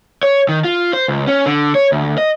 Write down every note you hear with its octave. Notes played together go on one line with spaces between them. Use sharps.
C#5
D#3
F4
C5
C#2
C#4
D3
C#5
D2
D#5